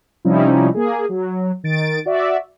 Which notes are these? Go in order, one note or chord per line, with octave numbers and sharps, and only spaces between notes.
C3 F3 G3 C#4 D#4 E4
A#3 G#4
F#3
D#3 A6 D7
F#4 D5 E5